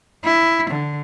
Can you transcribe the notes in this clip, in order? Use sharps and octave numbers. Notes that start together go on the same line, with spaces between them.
E4
D3